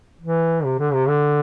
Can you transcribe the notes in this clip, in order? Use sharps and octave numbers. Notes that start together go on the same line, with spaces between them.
E3
C3
D3
C3
D3